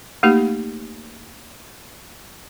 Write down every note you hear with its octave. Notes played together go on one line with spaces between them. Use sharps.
A3 A#3 D#4 G4